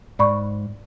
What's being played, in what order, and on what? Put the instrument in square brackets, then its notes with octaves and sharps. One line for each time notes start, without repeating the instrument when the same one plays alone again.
[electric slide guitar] G#2 [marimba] D5 B5 C#6